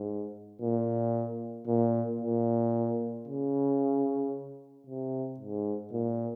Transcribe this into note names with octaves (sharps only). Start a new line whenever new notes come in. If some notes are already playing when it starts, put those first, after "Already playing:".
Already playing: G#2
A#2
A#2
A#2
C#3
C3
G#2
A#2